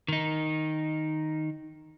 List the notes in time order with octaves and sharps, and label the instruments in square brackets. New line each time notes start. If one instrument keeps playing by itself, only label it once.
[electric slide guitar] D#3 D#4